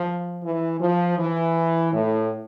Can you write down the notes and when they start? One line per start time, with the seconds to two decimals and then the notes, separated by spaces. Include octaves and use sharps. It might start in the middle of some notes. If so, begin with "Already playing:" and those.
Already playing: F3
0.44 E3
0.81 F3
1.18 E3
1.93 A2